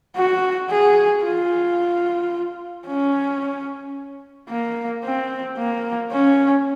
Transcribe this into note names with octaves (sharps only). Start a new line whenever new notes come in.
F#4
G#4
F4
C#4
A#3
C4
A#3
C#4